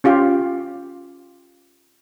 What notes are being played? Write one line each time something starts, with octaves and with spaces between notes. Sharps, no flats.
C#4 F4 G4 F5